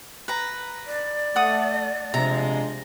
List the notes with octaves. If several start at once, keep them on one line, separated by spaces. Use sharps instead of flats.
B4 A#5
D5
A3 F#5 D#6
C3 F3 G#3 D4 A#5